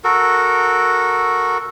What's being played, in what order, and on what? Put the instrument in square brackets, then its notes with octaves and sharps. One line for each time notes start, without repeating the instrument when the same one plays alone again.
[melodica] F#4 A4 A#4